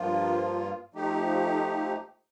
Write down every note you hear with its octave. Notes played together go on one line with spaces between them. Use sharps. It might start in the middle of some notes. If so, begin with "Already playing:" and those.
Already playing: G2 F3 A#3 F4
F3 A3 D#4 G4